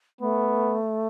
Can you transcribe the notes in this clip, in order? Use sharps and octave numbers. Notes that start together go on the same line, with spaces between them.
A3 B3